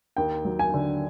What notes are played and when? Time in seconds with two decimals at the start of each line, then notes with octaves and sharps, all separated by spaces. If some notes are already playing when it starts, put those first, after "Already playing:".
0.17 D#2 G5
0.45 F#3
0.59 G#5
0.74 D3